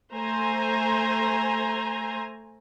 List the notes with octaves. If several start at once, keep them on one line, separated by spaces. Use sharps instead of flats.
A3 C5 G#5 A#5